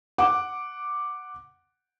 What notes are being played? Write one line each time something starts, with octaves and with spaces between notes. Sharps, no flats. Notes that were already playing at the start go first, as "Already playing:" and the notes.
F#5 D6